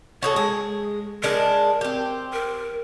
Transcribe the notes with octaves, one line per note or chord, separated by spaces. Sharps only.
F#4 G#4 A4 C#5
G#3 G#4
G#3 D4 A#4
C4 G4
A#4